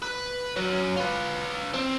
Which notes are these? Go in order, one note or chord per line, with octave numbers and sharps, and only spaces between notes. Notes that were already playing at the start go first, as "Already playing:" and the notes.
B4
F#3 C#4
F4 B4
C4